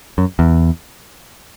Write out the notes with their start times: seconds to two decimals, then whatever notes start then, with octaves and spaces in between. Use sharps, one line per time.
0.18 F#2
0.39 E2